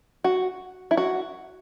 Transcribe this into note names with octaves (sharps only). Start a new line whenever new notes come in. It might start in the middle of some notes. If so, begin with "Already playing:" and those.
F#4
E4
F#4